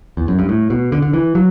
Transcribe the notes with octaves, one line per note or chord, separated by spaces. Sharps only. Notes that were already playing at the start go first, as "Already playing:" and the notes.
E2
F#2
G2
A2
B2
D3
D3
E3
F#3